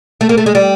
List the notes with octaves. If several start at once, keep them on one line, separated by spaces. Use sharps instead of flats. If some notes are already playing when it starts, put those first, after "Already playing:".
A3
A#3
A3
G#3
G3